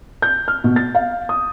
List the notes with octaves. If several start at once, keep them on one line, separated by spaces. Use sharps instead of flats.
G6
F6
B2
A6
F5
D#6